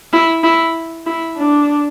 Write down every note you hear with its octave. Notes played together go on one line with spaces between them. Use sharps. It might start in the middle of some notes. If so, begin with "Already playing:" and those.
E4
E4
E4
D4